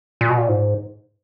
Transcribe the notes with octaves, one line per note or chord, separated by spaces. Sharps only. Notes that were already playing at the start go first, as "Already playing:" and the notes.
A#2
B2
A#2
G#2